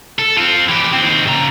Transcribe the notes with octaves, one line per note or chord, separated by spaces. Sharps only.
A4
C4 F4
E3 G4
D#2 C4
C#3 A#5